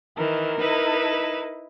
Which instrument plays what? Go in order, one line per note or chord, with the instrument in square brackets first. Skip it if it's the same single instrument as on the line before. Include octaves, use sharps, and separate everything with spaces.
[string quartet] D#3 E3 [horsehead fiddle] A#4
[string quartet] D#4 E4 B4